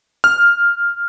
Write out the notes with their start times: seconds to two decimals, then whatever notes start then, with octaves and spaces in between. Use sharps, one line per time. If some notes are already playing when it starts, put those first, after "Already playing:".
0.24 F6